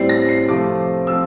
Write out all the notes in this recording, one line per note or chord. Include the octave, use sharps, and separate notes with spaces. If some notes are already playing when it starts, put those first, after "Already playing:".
Already playing: A2 G3 C4 C7
A#6
C7
C3 F3 A3 C4 D6
F3 C4 F4 E6